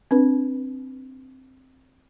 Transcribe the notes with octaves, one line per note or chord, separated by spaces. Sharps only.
C4 D4 B4